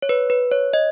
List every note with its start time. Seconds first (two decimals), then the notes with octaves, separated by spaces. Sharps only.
0.02 C#5
0.09 B4
0.30 B4
0.52 C#5
0.73 D#5